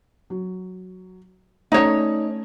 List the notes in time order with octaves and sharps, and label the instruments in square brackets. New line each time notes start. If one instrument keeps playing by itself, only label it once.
[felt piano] F#3
[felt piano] A3 C#4 D5 [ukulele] D#4 C#5